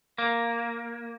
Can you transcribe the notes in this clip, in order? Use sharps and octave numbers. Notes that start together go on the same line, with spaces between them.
A#3